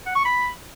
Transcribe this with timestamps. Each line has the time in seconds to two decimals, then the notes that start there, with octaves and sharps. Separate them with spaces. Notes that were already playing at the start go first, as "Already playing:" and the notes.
0.06 F#5
0.16 C#6
0.25 B5